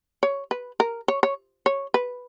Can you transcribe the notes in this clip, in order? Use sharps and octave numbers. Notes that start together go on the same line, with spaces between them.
C#5
B4
A#4
C#5
C#5
C#5
B4